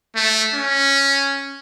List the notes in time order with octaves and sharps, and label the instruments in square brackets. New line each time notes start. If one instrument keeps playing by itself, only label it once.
[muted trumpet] A3
C#4